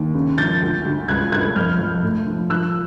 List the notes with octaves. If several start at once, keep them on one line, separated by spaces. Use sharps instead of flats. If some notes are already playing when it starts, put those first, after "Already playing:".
Already playing: D#2
C#3
F3 G6 A6
D2
D2
C#2 F#6 G#6
C#2 F#6 G#6
F2 F6 G6
F2
A2
F3
F3 E6 F#6